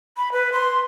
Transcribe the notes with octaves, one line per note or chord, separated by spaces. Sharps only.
B5
B4
C6